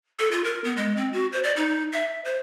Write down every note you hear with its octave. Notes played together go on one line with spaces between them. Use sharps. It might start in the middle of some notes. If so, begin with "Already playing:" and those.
A4
F4
A#4
B3
G#3
C4
F#4
C5
D5
D#4
E5
C5